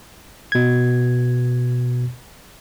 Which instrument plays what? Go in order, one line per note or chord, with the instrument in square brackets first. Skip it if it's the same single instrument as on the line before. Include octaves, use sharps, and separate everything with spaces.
[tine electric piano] B2 G#6